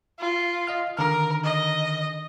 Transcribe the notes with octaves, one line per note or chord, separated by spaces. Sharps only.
F4
D#5 F5 F6
D3 D#3 A#4 F6
D#5